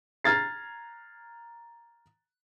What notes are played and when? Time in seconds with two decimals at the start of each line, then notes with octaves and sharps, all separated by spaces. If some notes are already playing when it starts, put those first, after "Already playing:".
0.24 A#5 F6 G#6 A6 C7